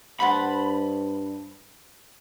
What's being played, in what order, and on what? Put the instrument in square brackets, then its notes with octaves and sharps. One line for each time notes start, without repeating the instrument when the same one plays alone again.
[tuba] G2 [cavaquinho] C5 F#5 A5 [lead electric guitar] B5